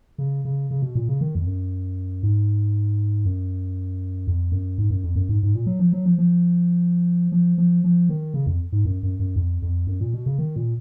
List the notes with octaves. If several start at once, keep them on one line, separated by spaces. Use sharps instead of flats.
C#3
C#3
C#3
B2
A#2
C#3
D#3
F2
F#2
G#2
F#2
F2
F#2
G#2
F#2
F2
F#2
G#2
G#2
A#2
F#3
F3
F#3
F3
F3
F3
F3
F3
D#3
C#3
F2
G#2
F#2
F#2
F#2
F2
F2
F#2
A#2
B2
C#3
D#3
A#2